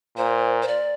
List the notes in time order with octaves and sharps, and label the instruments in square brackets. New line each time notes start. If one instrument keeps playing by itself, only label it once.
[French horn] A#2 [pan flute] C5
[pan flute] C5
D5